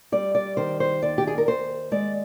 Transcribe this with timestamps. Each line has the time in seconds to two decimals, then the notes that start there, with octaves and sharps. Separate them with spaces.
0.12 G3 D5
0.35 D5
0.57 D#3 C5
0.80 C5
1.02 D#2 D5
1.18 G4
1.27 G#4
1.38 A#4
1.47 D#2 C5
1.92 G#3 D5